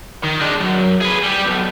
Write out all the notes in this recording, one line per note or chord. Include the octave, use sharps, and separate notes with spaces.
D#3
G#3 D4
F#2
G#4 B4
G3 G4
B1